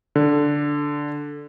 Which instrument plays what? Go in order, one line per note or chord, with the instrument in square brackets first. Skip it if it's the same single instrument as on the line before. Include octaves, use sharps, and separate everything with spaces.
[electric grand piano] D3